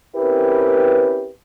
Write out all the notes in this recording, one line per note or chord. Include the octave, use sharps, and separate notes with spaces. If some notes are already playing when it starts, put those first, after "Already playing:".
C4 C#4 E4 G4 A#4 B4